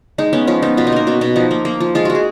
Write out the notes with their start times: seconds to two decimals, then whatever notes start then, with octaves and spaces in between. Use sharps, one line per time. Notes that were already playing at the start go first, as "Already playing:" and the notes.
0.18 G#3 D#4
0.33 B3 C#4
0.47 F3 C#4
0.62 B3 D#4
0.77 B2 F4
0.87 D#4
0.92 A#3 A#4
1.07 B2 F#4
1.21 B2 F#4
1.36 F3 D#4
1.51 A#3
1.65 A#3
1.80 F3
1.95 G#3 F4
2.05 G#3 F#4
2.15 G#4